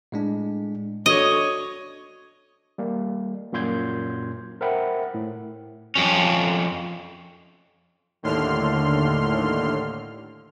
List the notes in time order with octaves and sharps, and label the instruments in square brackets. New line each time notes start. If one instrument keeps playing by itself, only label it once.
[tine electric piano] A2 G#3 D4
[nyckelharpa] D4 C#5 [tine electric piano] F#4 A4 D#6 [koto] D#5
[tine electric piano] G3 A#3
F#2 A#2 A#3 C6 G6 G#6
A#4 C5 E5 F#5 G5 B5
A2
[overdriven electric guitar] F2 C#4
[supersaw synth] D#2 A2 D3 C6 F6